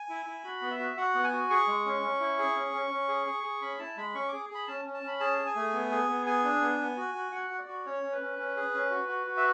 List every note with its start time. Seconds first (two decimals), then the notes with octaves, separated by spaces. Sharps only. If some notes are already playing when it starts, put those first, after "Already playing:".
Already playing: G#5
0.09 E4
0.26 E4
0.44 F#4 B5
0.62 B3
0.71 E5
0.79 F#4
0.97 F#4 F#5
1.15 B3
1.24 G#5
1.33 F#4
1.50 G#4 C#6
1.68 G#3
1.85 C#4
2.03 C#4
2.20 E4
2.39 G#4
2.56 C#4
2.73 C#4
2.91 C#4
3.08 G#4
3.27 G#4
3.43 G#4
3.62 C#4 B5
3.79 E4 A5
3.97 G#3 B5
4.14 C#4 C#6
4.28 G#4 D6
4.49 G#4
4.55 B5
4.67 C#4 A5
4.85 C#4
4.94 A5
5.03 C#4 B5
5.20 G#4 A5
5.38 G#4
5.46 G#5
5.56 A3
5.73 B3
5.91 G#4
6.09 B3
6.26 G#4 G#5
6.44 D4
6.61 B3
6.80 B3
6.97 F#4
7.14 F#4
7.32 F#4 F#5
7.50 F#4
7.59 D5
7.68 F#4
7.86 C#4 C#5
8.03 C#4
8.12 B4
8.21 C#4
8.39 C#4
8.56 G#4
8.74 C#4
8.91 F#4
9.09 F#4
9.27 F#4
9.37 E5